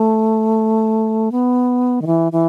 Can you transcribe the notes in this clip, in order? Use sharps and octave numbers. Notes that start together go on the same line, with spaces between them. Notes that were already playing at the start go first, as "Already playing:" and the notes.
Already playing: A3
B3
D#3
E3
E3